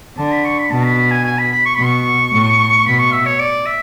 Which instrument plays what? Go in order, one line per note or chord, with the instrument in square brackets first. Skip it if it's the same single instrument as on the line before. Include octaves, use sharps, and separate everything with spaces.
[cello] D3 [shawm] A5
[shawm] B5
C#6
B5
[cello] B2 [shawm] A5
[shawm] B5
B5
G#5
G#5
B5
B5
C#6
[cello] B2 [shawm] B5
[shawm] C#6
[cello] A2
[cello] B2 [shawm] B5
[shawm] C#6
E5
C#5
D5
E5